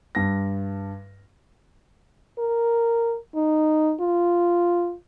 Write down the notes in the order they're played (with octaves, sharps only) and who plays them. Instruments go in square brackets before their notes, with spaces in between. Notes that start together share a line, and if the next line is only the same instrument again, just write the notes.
[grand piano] G2 A#6
[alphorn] A#4
D#4
F4